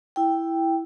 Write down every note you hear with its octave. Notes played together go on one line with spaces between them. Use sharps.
E4 G5